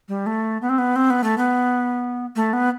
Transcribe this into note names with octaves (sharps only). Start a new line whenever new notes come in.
G3
A3
B3
C4
B3
C4
B3
A3
B3
A3
B3